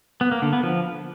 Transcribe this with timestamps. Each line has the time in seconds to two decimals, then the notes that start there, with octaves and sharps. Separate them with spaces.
0.21 B3
0.32 A#3
0.42 D3
0.53 B3
0.63 F3